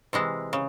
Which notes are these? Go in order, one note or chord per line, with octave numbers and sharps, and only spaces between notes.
C3 E3 G#3
C#3